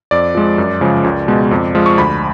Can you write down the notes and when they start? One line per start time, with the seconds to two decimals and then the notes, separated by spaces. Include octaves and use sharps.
0.11 F2 D5
0.35 F3 G#3
0.58 F#2
0.81 C#3 F3 G#3
1.04 C#2
1.28 B2 G#3
1.51 F2
1.75 F3 G#3
1.86 C#6
1.97 D2 B5